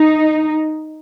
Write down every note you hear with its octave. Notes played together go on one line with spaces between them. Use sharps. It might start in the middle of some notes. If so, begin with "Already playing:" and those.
Already playing: D#4